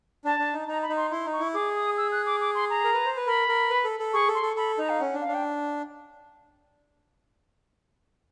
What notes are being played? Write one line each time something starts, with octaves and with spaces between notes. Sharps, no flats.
D4 A5
D4
D#4
D#4 A#5
B5
D#4
C6
E4 C6
D#4
C#6
E4
G#4 D6
D#6
E6
F#6
D6
D6
C6
A#5
A#4
B4
C5
B4
A#4 B5
A#4
B4
A4
A4
G#4 C#6
A4
C6
A4
A4 B5
D#4 A#5
F5
C#4 F#5
D4
F5
D4
G5